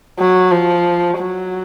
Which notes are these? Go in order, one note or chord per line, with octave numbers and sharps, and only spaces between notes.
F#3
F3
F#3